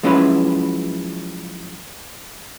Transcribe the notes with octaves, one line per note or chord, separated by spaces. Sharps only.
F3 F#3 G#3 C#4 E4 B4